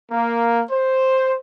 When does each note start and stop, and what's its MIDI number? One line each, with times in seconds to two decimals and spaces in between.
0.11 0.61 58
0.71 1.36 72